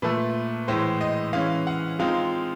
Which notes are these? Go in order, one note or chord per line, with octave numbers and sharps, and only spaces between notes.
A#2 F3 A3 B4
A2 E3 G#3 C5
D#5
E3 G#3 C#4 F5
F#5
F3 G#3 C4 D#4 F5